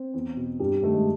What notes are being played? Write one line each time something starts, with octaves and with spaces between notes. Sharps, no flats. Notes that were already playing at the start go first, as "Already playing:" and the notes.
Already playing: C4
E2
B2
G2 G3
D#3 A3
G#3